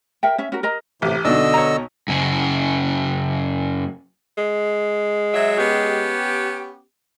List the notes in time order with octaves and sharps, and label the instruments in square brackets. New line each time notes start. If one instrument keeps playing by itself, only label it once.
[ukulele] A#4 E5 G5
C#4 E5
C#4 F#4 A#4
A#4 D#5 A#5
[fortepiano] A1 [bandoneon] A2 C3 [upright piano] G4
[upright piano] B1 B2 [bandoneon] D3 D#5 E6 [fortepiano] D4
[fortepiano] C#5 A#5
[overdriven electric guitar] F#2 C#3
[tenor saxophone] G#3
[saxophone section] F#3 E5
B3 C#4 G4